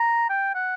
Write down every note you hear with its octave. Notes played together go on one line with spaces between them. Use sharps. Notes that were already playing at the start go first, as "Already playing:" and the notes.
Already playing: A#5
G5
F#5